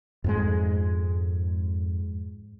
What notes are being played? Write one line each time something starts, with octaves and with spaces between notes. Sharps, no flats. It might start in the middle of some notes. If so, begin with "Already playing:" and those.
F2 G#2 G#3